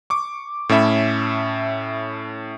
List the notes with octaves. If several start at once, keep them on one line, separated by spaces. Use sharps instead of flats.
C#6 D6
A2 C#4 A4 E5 B5